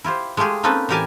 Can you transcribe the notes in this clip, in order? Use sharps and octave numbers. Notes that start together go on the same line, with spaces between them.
E4 F4 G4 C5
G#3 A3 F4 G4 G#4
A#3 C4 C#4 D#4 A4 B4
A2 E3 G4 A#4 G#5 A5